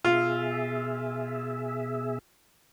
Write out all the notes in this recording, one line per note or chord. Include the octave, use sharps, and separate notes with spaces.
B2 F4 G#4 E5